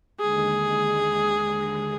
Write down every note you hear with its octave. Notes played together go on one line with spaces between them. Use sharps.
D#2 D3 G#3 G#4